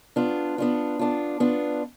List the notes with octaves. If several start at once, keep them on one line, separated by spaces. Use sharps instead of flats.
B3 D4 F4
B3 D4 F4
B3 D4 F4
B3 D4 F4